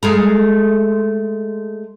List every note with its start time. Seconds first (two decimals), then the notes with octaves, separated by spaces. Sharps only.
0.03 G#3 A3 A#4